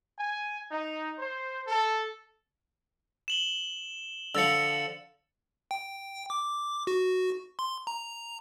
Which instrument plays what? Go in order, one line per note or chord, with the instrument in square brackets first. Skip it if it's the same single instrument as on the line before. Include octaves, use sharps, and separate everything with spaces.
[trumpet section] G#5
D#4
C5
A4
[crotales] E7 F#7 G7
[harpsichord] D3 F3 [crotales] E6 A6 C#7
[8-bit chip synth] G5
D6
F#4
C6
A#5